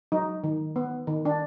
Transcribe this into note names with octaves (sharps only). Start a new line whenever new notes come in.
F#3 D#4
D#3
B3
D#3
D4